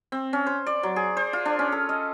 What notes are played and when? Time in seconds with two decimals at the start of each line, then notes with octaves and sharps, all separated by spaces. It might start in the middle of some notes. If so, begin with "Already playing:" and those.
0.12 C4
0.33 C#4
0.47 C5
0.66 D5
0.83 F#3
0.96 G#4
1.17 C5
1.33 F4
1.45 D4
1.59 C#4
1.72 A4
1.89 D#5